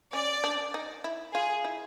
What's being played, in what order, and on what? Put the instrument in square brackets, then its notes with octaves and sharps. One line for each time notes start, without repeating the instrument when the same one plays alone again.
[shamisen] C#4 [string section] D5
[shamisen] D4
D#4
E4
[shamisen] F4 [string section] G#4
[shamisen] E4